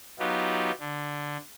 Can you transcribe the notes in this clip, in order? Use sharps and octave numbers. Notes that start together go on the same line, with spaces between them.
F#3 B3 D#4 F4 G4
D3